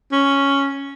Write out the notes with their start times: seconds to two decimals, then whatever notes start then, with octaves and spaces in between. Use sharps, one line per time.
0.12 C#4